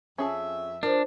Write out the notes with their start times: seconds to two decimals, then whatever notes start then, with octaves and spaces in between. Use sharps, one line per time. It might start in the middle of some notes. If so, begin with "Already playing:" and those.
0.18 F2 C#4 G#4 E5 A5
0.83 F3 D4 A#4